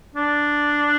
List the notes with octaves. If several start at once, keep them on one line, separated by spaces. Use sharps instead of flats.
D4